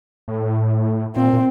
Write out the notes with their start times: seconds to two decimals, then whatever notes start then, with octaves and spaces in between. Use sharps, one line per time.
0.28 A2
1.15 A#2 C4
1.33 A#2